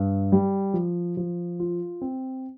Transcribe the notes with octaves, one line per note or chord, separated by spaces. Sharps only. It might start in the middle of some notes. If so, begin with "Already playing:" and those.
Already playing: G2
G3
F3
F3
F4
C4